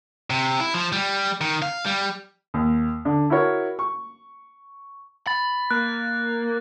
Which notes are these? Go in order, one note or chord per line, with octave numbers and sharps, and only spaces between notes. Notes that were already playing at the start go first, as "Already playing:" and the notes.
C3
E4
F3
G3
D#3
F5
G3
D#2
D3
E4 F#4 A#4 C#5
C#6
B5 A6
A#3 F#6